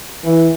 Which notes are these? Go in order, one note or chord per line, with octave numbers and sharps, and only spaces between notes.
E3